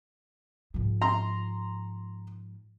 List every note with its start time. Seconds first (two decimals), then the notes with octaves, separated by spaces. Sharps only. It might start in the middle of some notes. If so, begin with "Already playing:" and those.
0.74 G#2 F3
1.02 A#5 C6